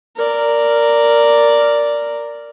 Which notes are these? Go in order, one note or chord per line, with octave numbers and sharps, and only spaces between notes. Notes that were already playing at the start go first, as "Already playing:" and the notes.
A#4 D5